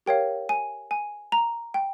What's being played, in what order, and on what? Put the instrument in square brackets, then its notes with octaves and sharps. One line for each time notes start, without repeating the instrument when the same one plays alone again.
[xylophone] G4 A#4 C#5 F5 G5
G#5
G#5
A#5
G5